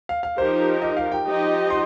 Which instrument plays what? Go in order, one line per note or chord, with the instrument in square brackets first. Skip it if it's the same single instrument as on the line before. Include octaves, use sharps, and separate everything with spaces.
[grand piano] F5
F5
[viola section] F3 D#4 G4 A#4 [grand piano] C5
[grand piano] D#5
F5
G5
[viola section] F3 D#4 G4 D#5
[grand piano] C6